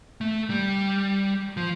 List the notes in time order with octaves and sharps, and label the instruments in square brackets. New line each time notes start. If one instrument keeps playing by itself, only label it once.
[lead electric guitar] A3
G3
F3